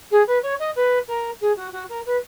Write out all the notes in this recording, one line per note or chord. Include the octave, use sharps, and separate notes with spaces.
G#4
B4
C#5
D#5
B4
A#4
G#4
F#4
F#4
A#4
B4